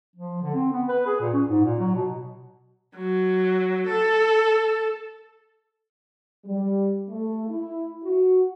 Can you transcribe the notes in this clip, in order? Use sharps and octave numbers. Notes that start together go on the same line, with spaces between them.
F3
D3
C4
B3
B4
G#4
A#2
C#4
G#2
A#2
F#3
B2
F#3
A4
G3
A3
E4
F#4